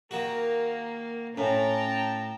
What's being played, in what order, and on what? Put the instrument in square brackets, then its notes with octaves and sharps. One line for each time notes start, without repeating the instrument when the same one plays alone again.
[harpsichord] D#3 F#4 [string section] A#3
[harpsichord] A2 [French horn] C#4 [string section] G5 A5 A#5